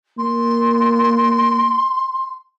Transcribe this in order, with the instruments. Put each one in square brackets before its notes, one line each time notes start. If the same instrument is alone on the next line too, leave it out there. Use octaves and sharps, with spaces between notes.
[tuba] A#3 [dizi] C6